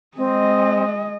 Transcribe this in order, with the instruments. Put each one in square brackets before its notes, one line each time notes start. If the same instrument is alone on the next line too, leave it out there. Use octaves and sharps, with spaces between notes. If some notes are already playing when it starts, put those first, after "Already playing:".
[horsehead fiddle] G#3 D#5 [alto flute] C4